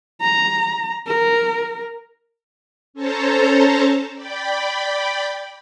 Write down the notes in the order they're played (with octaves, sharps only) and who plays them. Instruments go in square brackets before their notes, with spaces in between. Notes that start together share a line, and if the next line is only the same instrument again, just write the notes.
[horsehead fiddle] A#5
A#4
[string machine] C#4 A4 C5 C#5 A5 A#5
D5 G5 B5